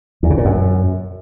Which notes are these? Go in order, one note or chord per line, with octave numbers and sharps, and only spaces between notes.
E2
C#3
A#2
F#2